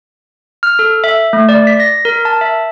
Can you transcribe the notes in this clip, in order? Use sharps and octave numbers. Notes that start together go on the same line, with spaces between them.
F6
A4
E5
A3
D5
B6
A#6
A#4
A5
E5